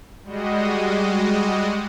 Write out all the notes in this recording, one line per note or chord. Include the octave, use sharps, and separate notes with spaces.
G3 G#3 F#4 D#5